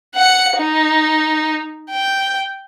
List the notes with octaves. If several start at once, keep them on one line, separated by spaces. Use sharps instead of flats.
F#5 C#7
D#4
G5